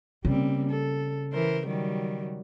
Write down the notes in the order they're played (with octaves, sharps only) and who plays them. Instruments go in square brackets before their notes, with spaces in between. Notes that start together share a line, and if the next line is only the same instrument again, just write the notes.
[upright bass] C#3 [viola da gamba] G3 A#3 C4
[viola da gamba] A4
E3 A#4 C5
D#3 F#3 G3